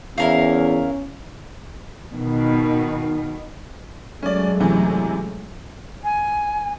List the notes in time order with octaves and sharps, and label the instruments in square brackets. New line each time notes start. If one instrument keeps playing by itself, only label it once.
[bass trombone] E2 [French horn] C#4 [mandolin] E4 A#4 F5
[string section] B2 D#3
[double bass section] F#3 G#3 A3 [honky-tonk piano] C#4 D5
[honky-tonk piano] F#2 C3 E3
[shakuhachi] G#5